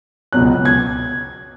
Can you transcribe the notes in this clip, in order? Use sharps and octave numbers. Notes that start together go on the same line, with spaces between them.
C#2 B2 F#3 F#6
G#6